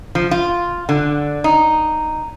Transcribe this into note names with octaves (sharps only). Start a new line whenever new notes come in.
F3
F4
D3
D#4